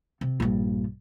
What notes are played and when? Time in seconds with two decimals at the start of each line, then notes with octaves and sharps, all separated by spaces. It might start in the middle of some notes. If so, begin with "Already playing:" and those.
0.21 C3
0.40 A#1 G2